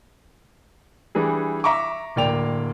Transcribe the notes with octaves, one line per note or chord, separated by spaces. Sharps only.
E3 G3 D4 G#4
E5 A#5 C#6 D6
D1 A#3 D5 G5 F7